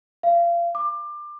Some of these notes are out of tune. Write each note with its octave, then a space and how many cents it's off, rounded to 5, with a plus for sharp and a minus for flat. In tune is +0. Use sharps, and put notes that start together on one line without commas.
F5 -30
D6 +25